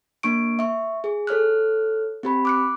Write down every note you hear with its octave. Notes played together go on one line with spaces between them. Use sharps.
A#3 D4 C#6 D7
E5 C#6
G#4
A4 C#5 F6 F#6
C4 G4 B5
D6 F#6 C#7